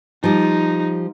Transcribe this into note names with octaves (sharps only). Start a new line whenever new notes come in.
F3 G3 D#4